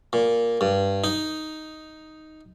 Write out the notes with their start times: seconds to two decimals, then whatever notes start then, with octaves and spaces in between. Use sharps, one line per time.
0.13 A#2
0.61 G2
1.04 D#4